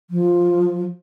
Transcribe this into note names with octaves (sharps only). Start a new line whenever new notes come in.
F3